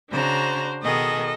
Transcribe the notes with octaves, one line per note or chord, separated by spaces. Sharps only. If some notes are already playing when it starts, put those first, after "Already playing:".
C#3 D4 F#4 C5 A#5
B2 D#3 G#4 A4 D#5